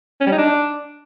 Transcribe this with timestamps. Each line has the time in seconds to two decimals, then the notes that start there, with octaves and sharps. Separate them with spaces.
0.20 C#4
0.26 G3
0.32 D#4
0.38 D4